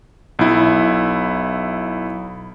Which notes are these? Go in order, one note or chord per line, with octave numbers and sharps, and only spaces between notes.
B1 E4